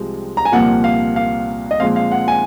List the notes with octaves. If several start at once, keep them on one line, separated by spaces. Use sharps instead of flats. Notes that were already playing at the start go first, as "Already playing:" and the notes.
Already playing: C2 C3 F3 G#3 C4
A#5
G#5
C2 A#2 F3 A#3 F#5
F5
F5
D#5
A#2 F3 G#3 C4 F5
F5
F#5
G#5